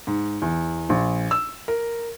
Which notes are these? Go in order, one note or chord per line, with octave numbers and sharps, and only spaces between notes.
G#2
E2
A#1
E6
A#4